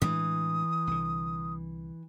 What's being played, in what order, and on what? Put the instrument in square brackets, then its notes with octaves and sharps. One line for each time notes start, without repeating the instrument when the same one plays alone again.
[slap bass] A2 G#3 D4 [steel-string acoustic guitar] E3 [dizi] D#6
[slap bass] C2 D3